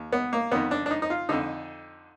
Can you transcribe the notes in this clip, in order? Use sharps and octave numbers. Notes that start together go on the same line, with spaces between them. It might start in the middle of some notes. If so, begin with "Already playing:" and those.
Already playing: D#2
B3
A#3
F2 D#3 B3
D4
D4
D#4
D#4
F4
F2 D3 D#4